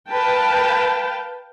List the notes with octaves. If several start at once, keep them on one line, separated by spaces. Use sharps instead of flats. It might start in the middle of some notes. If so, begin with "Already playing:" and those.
A#4 B4 F5 G5 A5